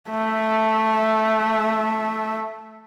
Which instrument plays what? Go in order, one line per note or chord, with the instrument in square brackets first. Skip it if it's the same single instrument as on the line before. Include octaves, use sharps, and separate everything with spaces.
[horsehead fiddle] A3 E5